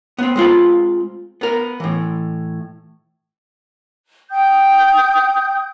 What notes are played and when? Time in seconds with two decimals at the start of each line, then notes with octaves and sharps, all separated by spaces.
0.18 B3 C4
0.36 G#3 C4 F4 B5
1.41 B3 A#4
1.80 A2 E3
4.30 G5 D#6 G6